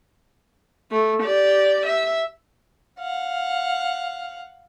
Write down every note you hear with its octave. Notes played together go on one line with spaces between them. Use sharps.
A3
G4 D5
E5
F5 F#5